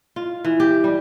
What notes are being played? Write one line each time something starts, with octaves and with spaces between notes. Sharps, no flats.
F4
E3
G4
G3